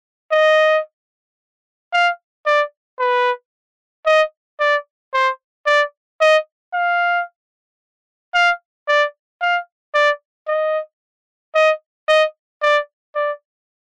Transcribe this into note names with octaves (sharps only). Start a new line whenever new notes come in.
D#5
F5
D5
B4
D#5
D5
C5
D5
D#5
F5
F5
D5
F5
D5
D#5
D#5
D#5
D5
D5